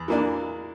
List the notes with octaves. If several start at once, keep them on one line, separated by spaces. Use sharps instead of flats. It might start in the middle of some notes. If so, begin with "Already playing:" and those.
Already playing: E2
E3 A#3 D4